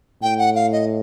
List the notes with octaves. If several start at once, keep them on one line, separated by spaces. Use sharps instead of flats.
A2 G5
F#5
F5
D#5